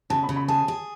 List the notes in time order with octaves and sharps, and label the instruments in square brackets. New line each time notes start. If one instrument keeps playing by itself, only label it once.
[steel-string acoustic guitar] C#3 [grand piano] A5
[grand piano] B5
[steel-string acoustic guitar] C#3
[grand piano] B5
[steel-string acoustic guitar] G#4 [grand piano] A5
[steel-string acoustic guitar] G#4